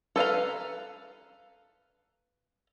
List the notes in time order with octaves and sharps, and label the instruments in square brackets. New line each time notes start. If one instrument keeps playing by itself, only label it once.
[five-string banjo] A4 B4 F5 A#5